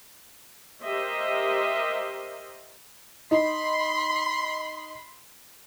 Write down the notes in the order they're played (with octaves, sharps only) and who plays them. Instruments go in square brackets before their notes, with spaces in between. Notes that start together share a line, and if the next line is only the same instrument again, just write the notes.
[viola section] G4 A#4 C5 D#5 E5
[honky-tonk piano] D#4 [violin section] B5 C6